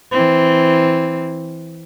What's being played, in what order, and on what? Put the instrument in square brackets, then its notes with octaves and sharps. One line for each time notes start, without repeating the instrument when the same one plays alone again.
[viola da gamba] E3 C4